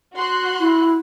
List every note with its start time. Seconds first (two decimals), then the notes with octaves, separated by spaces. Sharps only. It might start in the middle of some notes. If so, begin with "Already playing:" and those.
0.15 F#4 C6 F#6
0.60 E4